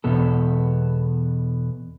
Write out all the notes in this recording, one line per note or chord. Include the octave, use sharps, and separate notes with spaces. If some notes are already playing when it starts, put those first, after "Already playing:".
E2 B2 B3 A4